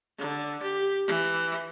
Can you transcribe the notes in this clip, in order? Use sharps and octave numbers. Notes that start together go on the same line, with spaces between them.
D3
G4
E3